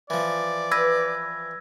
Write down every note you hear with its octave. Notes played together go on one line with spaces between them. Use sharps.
E3 F3 D5
B4 E6 G#6 A#6